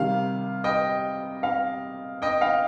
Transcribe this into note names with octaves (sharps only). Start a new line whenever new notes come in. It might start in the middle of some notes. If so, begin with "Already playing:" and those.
Already playing: C3 D#3 G3 F5
D#5 G5
F5
D#5 G5
F5